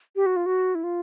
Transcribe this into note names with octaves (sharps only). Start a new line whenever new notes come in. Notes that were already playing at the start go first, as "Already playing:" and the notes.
G4
F#4
F4
F#4
E4
F4